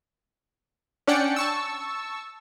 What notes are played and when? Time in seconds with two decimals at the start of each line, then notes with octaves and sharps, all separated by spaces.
1.07 C#4 D4 D5 F#5 G5 C#7
1.36 A5 C#6 E6